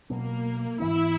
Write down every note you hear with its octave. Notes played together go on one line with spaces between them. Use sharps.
B2 F#3 A#3 B3
G#2 E3 B3 E4